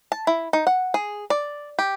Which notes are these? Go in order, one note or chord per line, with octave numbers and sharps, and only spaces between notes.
A5
E4
D#4
F#5
G#4
D5
G4